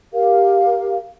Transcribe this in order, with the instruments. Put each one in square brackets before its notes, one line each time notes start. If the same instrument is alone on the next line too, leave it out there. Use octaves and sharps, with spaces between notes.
[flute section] G4 A#4 F5